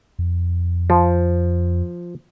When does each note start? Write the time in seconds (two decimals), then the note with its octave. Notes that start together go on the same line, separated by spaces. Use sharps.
0.19 F2
0.90 F3